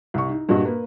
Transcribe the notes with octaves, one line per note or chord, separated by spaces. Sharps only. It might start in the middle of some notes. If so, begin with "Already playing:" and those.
C2 C#6
D#4
G2 A#2 D4 F#4 D#5
A#3 B4